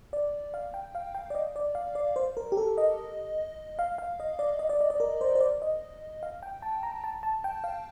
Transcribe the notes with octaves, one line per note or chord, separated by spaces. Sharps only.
D5
F5
G5
F5
G5
D5
D#5
D5
F5
D5
C5
A#4
G4
A4
D#5
F5
F5
D#5
D5
D#5
D5
D#5
D5
A#4
C5
C5
D5
D#5
F5
G5
A5
A#5
A5
A5
G5
F5